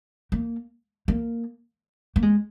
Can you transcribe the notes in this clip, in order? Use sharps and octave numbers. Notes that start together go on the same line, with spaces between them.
A#3
A#3
A#3
G#3